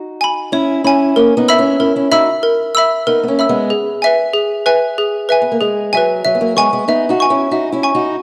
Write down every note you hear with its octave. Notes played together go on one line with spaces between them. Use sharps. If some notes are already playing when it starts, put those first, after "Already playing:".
Already playing: D#4 F#4
G#5 B5
C#4 E4 C#5
C#4 E4 G#5 B5
A#3 C#4 A#4
B3 D#4
E5 B5 E6
C#4 E4
C#4 E4 A#4
C#4 E4
D#4 F#4 E5 B5 E6
A#4
E5 B5 E6
B3 D#4 A#4
B3
A#3 C#4
E5 B5 E6
G#3 B3
G#4
B4 E5 G#5
G#4
B4 E5 G#5
G#4
B4 E5 G#5
B3
A#3
G#3 G#4
F#3 B4 E5 G#5
F#3 E5
B3
F#3 A#3
G#3 B3 G#5 C#6
G#3 B3
B3 D#4 E5
D#4 F#4
G#5 C#6
C#4 E4
D#4 F#4 E5
C#4 E4
G#5 C#6
D#4 F#4